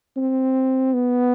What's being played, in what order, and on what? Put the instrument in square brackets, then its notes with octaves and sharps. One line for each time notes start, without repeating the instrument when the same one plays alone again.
[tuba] C4
B3